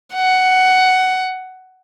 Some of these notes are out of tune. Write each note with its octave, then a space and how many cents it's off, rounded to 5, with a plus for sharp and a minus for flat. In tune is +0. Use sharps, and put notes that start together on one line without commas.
F#5 +10